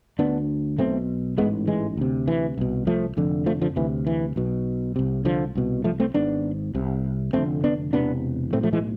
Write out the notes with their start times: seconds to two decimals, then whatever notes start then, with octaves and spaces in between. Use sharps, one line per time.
0.19 D2 D3 B3 D4
0.78 B1 B2 A3 C4
1.38 A1 G#2 G#3 B3
1.67 E3 G#3
1.97 D2 C3
2.28 E3
2.58 C2 B2
2.87 F3 A3
3.17 F1 F2 D3
3.46 F3 A3
3.61 D3 F3
3.76 D2 C3 E3
4.07 E3
4.36 B1 B2
4.96 C2 C3
5.25 D3 F3
5.55 C2 B2
5.84 F3 A3
6.00 A3 C4
6.14 G#1 G#2 B3 D4
6.75 C2 C3
7.33 F1 F2 D3 A3 C4
7.64 B3 D4
7.93 E1 E2 C3 B3 D4
8.53 B1 A2 A3 C4
8.63 F3 A3
8.73 E3 G#3